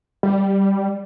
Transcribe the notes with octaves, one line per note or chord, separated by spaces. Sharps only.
G3